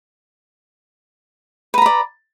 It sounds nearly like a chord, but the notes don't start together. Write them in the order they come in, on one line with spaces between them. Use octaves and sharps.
B4 A#5 B5 D5